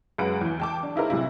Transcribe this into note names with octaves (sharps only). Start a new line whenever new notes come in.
F#2 G#3 B4 F#5 D7
E2 E3
G5 A5 D6
D4
D#4 E4 G#4 A#4 C5
B1 C3 E4